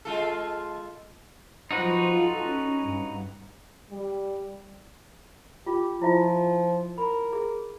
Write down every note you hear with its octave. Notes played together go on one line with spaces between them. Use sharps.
G#3 F4 A4
F3 D#4 F#4 B4 C5
F4 A4
C#4
G2
G3
F4 G4
F3 E4 F4 E5
A#4 B5
G#4